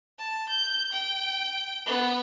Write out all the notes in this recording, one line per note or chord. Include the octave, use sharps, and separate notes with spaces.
A5
G6
G5
B3